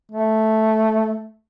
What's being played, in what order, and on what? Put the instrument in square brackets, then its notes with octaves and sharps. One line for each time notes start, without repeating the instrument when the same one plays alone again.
[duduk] A3